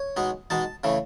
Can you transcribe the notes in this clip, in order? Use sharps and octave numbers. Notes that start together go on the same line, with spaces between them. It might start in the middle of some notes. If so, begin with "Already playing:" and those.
Already playing: C#5
B2 G#3 D#4
B2 G#3 D#4 A5
C#3 E3 A3